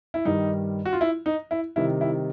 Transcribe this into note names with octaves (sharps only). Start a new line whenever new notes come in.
E4
G2 D#3 G3 D#4
F#4
F4
E4
D#4
E4
C3 D#3 G3 E4
E4